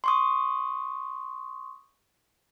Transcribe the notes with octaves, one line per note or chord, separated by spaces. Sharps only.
C6 C#6 D#6